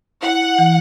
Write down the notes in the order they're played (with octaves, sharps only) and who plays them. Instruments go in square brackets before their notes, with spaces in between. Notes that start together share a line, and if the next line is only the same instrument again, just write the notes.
[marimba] E4 [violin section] F#5
[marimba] E3